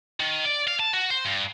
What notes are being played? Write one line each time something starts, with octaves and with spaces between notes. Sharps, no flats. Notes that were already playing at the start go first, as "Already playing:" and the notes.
D#3
D5
F5
A5
F#4
C5
G2